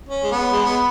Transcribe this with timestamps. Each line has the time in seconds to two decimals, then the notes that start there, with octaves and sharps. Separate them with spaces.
0.09 C#4
0.23 G#3
0.31 B3
0.52 G#3
0.64 B3